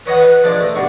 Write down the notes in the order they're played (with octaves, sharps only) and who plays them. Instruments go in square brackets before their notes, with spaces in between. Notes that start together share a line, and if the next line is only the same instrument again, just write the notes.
[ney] B4 [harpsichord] C#5 D#5 F#5
[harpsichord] F3 G#3 D4
A3 D#4
[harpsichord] G2 B2 C#6 [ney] D5